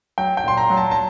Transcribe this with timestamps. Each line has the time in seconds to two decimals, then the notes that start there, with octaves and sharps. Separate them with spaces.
0.18 F#3 G5
0.37 G5
0.44 A#2 C6
0.57 A#5
0.70 F#3
0.77 A5
0.91 A5